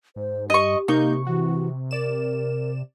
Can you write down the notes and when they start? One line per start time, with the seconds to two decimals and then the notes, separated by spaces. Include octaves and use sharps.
0.16 G#2 C5
0.50 G2 G4 D#5 C#6
0.88 C3 A#3 D#4 C#6 G6
1.27 E3 F#4
1.91 A#4 D5 E7